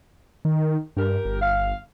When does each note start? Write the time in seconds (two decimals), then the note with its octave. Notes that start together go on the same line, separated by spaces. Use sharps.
0.45 D#3
0.97 G2 G4 A#4
1.25 G1
1.41 F5